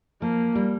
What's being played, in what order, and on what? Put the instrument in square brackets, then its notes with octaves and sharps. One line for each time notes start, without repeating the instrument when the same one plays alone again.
[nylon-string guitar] F3 [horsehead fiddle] A#3
[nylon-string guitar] G3